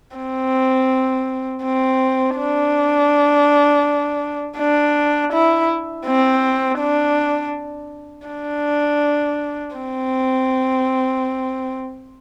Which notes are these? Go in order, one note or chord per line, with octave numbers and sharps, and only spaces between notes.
C4
C4
D4
D4
E4
C4
D4
D4
C4